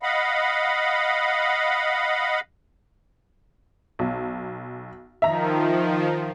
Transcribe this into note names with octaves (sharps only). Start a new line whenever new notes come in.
D#5 F5 F#5 B5
B1
D#3 F3 E5 A#5